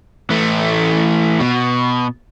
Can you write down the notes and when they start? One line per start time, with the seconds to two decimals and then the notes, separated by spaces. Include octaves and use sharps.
0.30 E3 A3
1.40 B2